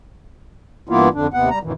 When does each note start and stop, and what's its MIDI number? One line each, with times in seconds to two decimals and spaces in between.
0.89 1.09 43
0.89 1.09 52
0.89 1.09 58
0.89 1.09 59
0.89 1.09 64
0.89 1.09 65
1.14 1.27 41
1.14 1.27 50
1.14 1.27 62
1.34 1.50 39
1.34 1.50 48
1.34 1.50 59
1.34 1.50 78
1.50 1.59 55
1.50 1.59 82
1.63 1.72 42
1.63 1.72 46
1.63 1.72 51
1.63 1.72 52